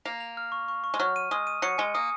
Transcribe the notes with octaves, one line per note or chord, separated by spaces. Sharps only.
A#3 F7
F7
F6
C#6
C#6
C#6
G#3
F#3 F6
D#7
G#3 D#6
D#7
F#3 C#7
G#3 G#5
A#3 D#6